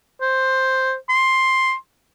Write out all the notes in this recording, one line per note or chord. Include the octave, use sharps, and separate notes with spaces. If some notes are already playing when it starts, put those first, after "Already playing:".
C5
C6